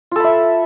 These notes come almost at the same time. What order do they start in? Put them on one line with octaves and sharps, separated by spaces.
F4 A4 B5 E5